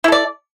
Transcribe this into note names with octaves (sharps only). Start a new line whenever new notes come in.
E4 A4 D5